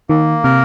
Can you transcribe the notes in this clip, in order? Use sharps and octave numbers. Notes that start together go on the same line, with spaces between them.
D#3 A#3
C3 A#4